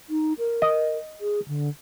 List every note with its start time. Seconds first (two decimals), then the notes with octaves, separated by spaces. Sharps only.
0.10 D#4
0.39 A#4
0.62 D#5
1.21 G#4
1.48 D3